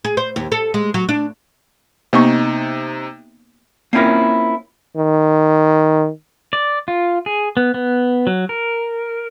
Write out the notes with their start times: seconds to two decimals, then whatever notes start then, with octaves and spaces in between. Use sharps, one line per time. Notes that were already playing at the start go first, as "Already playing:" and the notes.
0.05 G#4
0.17 C5
0.36 D#2
0.52 A4
0.74 G#3
0.94 F#3
1.09 D4
2.13 C3 A#3 B3 D#4 C#6
3.93 A#3 C4 C#4 E4 F4 A#4
4.97 D#3
6.53 D5
6.88 F4
7.26 G#4
7.57 B3
7.74 B3
8.27 F#3
8.49 A#4